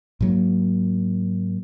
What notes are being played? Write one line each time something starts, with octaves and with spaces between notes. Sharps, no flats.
G#2 F#3 A#3